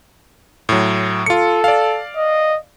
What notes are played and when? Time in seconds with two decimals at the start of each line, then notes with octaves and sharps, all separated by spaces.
0.69 A2 F#3
1.26 F4 A4 C#7
1.64 D5 F5
2.16 D#5